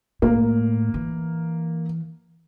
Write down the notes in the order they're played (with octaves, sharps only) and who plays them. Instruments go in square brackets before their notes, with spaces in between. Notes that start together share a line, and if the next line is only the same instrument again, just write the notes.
[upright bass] A2 [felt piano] A#3
[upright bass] E3